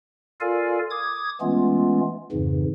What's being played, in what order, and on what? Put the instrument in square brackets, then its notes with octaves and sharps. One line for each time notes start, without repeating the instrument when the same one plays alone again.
[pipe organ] F4 A4 A#4 D5 F5 G#5
D6 D#6 G#6
E3 G#3 A3 B3 C#4 F4
F2 G#2 C#3 E3